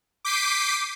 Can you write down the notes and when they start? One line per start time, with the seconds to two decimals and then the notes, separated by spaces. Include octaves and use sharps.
0.25 D6 G6 B6 C7 D#7